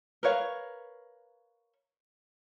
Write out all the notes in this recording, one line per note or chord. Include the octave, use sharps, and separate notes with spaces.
A#4 B4 C#5 F5